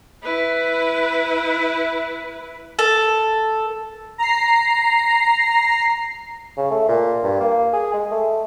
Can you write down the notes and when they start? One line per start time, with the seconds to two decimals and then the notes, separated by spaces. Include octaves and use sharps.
0.23 E4 B4
2.79 A4
4.18 A#5 C7
6.57 C#3
6.71 A3
6.88 A#2
7.23 G2
7.40 A#3
7.73 G#4
7.93 G#3
8.11 A3